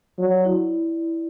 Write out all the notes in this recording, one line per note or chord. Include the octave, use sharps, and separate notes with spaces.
F#3 D5
E4